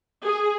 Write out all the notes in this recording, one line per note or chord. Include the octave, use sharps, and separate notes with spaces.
G#4